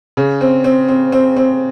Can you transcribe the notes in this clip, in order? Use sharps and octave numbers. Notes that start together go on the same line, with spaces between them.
C#3
C4
C4
C4
C4
C4